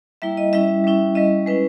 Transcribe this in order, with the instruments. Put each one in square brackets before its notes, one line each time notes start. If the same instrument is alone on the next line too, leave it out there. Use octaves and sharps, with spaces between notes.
[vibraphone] G3 A#3 E4 E5
D#5
G3 C#4 E4 E5
G3 C#4 E4
G3 C#4 E4 D#5
G#3 C#4 E4 B4